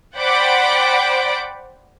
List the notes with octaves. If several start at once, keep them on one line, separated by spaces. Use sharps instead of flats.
C5 D5 F#5 G5 B5 D6